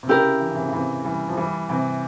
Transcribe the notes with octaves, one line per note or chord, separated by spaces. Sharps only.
C3
C#3 E4 G4 A#4
E3
C#3
C3 E3
C#3
C3 E3
E3 G3
F3
E3 G3
C3 E3